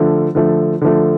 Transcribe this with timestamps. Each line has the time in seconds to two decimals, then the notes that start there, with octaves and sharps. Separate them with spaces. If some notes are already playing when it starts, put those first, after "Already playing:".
Already playing: D3 F3 A3
0.35 D3 F3 A3
0.81 D3 F3 A3